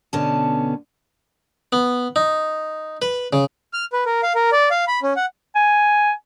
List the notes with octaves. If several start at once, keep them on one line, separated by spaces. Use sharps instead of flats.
B2 D3 B3 C#4 A5
B3
D#4
B4
C#3
F6
B4
A#4
F5
A#4
D5
F5
B5
C#4
F#5
G#5